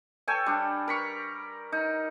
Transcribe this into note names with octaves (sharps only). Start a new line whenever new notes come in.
A4 C#5 G5 G#5
G3 D4
A#4 B5 C#6
D#4